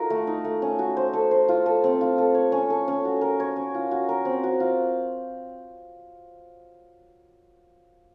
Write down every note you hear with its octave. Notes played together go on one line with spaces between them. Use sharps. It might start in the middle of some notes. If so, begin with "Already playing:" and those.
Already playing: D#4 F4 F#4 A4 A#4
A3
D#4
A3
C#4
F#4
C5
A4
C5
F4
A4
C4
F4
A4
C#5
C#4
A4
C#4
F#4
A#4
C#5
C#4
F4
F#4
A#4
C4
F#4
F4